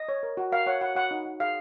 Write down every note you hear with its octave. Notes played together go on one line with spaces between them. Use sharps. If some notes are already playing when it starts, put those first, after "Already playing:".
Already playing: D#5
C#5
A#4
F#4
A#4 F5
C#5 F#5
F#4 F#5
F#4 F#5
D#4
D#4
G#4 F5